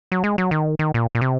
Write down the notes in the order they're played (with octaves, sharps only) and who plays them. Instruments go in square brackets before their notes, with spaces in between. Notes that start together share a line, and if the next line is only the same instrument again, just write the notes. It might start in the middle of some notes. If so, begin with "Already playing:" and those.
[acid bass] F#3
G#3
F#3
D#3
D#3
A#2
A#2
C3